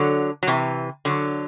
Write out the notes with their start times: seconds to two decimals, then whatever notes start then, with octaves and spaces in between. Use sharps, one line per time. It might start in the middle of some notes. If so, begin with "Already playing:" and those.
Already playing: D3 F#3
0.43 F#3
0.47 C3 E3
1.05 D3 F#3